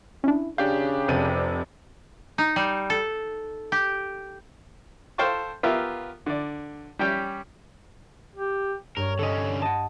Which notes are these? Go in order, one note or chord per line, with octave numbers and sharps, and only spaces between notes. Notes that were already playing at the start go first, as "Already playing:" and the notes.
C#4 D4 E4
C#3 D4 G4 F5 G6
F1 C3 D#7
D#4
G3
A4
G4
A4 C5 F5 G5 A5 C#6
B3 F4 G4 A#4 E5 F5
D3 D5
G3 C#4 G4 G5
G4
G2 A#4 C#5
D3 C#4 A4 D#5
D#5 F#5 A5